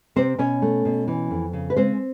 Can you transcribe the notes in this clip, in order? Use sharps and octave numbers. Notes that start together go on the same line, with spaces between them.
C3 C4 C5
B2 C#4 C#5
A3
B2
E3
F2
C#3
B4
G#3 C4 C5